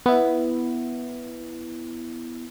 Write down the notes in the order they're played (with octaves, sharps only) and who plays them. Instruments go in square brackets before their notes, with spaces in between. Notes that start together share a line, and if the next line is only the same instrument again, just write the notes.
[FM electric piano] B3 E4